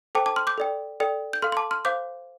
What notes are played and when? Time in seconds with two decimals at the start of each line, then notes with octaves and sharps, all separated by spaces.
0.15 A4 C5 G5 A5 D6
0.26 A5 D6
0.36 C6 F6
0.47 D6 G6
0.58 A4 D5 G5
1.00 A4 D5 G5
1.33 G6
1.42 A4 F5 C6 F6
1.52 C6
1.57 A5 D6
1.71 C6 F6
1.85 C5 F5 D6 G6